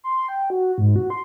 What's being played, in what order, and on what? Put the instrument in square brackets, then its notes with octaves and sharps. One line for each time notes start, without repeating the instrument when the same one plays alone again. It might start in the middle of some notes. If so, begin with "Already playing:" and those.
[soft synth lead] C6
G5
F#4
G#2
F#4
C6